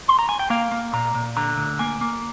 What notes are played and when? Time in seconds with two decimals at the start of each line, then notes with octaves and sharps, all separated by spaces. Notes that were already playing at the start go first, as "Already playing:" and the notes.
0.08 C6
0.19 A#5
0.29 G#5
0.39 G5
0.50 A#3 F5
0.71 A#3
0.93 A#2 A#5
1.15 A#2
1.36 D3 A#5
1.58 D2
1.79 A#3 G#5
2.01 A#3